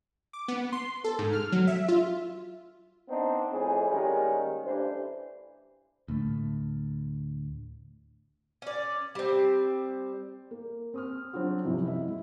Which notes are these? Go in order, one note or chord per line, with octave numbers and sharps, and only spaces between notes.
D6
B3
C6
A4
G#2
F6
F#3
E5
F4
B3 C4 D4 D#4 C5
F2 A2 E3 G#4 C5
D#3 G3 G#3 A#3 C#4
A1 G2 E3 D4 C5
D2 A2 A3
C#4 D5
G3 C4
A#3
C4 D#6 F6
F#3 C4 D4 F4 F#4
F#2 C3 E3 F3
E4 D#5 E5
G#3